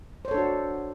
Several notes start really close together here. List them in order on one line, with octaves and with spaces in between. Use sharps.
C5 C#5 A4 D4 F#4